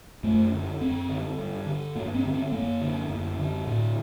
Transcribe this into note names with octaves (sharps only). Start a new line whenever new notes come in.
F#2 A3
D3
F#2 C4
D3
G2
D3
G2 A#3
C4
D3
C4
F#2 A#3
D3
F#2
D3
A2